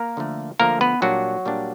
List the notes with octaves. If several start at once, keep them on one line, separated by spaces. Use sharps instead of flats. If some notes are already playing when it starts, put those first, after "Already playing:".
Already playing: A#3 A#4
D3 F3 A3
D3 F3 A3 A#3 A#4
B3 B4
A#2 F#3 G3 A#3 D4 F#4
A#2 G3 A#3 D4